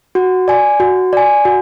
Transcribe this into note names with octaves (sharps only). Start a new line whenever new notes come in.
F#4
D5 G#5
F#4
D5 G#5
F#4